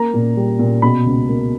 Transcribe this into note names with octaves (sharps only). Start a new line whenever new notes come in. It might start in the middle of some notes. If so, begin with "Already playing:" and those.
Already playing: A#3 A#5
A#2
G3
A#2
B2 B5
C#2
A#3